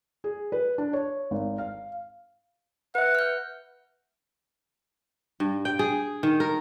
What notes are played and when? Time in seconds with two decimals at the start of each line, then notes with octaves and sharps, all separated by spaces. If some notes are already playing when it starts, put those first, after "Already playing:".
0.24 G#4
0.52 B4
0.78 D4
0.93 C#5
1.31 G#1
1.58 F5
2.95 B4 E5 F#5
3.15 F6 G6
5.40 G2
5.65 G5
5.79 G#4
6.23 D#3
6.40 A#4